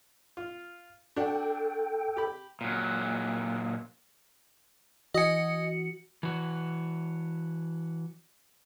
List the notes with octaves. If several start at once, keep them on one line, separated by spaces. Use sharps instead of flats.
F4
D4 F#4 A4 G5
G4 B5
A#2 F#3
E3 F#4 D#5 G#5 C#7
E3 F#4